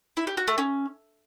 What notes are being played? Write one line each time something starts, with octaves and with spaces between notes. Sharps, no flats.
E4
G4
F#4
A3
C#4